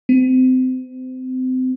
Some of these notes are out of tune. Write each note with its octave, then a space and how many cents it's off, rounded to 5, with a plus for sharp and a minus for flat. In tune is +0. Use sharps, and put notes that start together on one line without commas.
C4 -30